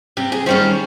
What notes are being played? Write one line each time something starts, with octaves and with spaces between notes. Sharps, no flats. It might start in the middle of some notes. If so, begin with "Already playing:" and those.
C3 G4
G#4
D#3 G3 C#4 C5